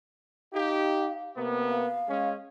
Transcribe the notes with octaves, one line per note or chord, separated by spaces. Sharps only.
D#4 G4 F5
C3 A#3 B3
F5
G#3 C#4